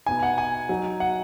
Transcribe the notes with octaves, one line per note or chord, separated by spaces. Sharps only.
B2 B3 D#4 G#5
F#5
G#5
F#3 D#4
F#5